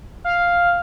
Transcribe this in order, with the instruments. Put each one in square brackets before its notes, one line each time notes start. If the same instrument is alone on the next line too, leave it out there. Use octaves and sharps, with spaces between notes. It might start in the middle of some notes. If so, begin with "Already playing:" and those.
[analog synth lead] F5